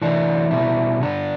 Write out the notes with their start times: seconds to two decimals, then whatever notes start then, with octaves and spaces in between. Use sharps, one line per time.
0.02 E3 A3 D4
0.51 B2 G3 E4
1.00 D3 G3 D4